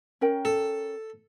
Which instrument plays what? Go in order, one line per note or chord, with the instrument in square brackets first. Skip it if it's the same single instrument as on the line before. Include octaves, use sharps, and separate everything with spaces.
[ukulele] C#4 A#4 G5
[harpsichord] A4